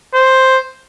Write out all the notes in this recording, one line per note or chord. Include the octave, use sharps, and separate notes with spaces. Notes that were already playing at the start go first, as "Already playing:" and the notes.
C5